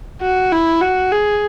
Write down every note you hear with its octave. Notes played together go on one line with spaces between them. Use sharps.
F#4
E4
F#4
G#4